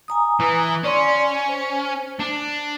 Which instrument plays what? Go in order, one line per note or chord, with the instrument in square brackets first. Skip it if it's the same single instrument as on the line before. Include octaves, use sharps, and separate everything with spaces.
[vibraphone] G#5 A#5 D#6
[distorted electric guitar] E3
[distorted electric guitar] C#4 [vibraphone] D5 C6
[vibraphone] C5
[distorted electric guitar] D4